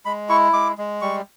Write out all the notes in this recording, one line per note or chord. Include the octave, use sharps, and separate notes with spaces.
G#3 B5
E4 C#6
G#3 D6
G#3
G3 C#6